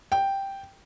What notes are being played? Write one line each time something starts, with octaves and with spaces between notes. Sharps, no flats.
G5